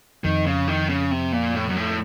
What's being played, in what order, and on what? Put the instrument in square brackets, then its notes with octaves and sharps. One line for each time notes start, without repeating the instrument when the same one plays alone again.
[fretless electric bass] F2 [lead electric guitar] D#3
[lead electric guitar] C#3
D#3
C#3
C3
A#2
A2
F#2
A2